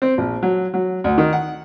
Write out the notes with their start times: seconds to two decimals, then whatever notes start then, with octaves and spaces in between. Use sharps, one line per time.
0.02 C4
0.18 A#1
0.43 F#3
0.74 F#3
1.04 D2
1.18 D#3
1.33 F#5